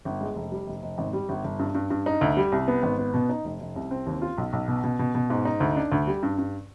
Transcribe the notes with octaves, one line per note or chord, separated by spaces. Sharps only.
G1
G#3
F1
G3
F1
F1
G#1
G3
G1
G1
G2
G2
G2
D#4
D2
G3
C2
B3
G#1
B3
B2
D#4
F1
F1
C2
C4
D#2
F4
B1
B1
B2
B2
B2
B2
G#2
D#4
D2
D4
D2
G3
G2
G2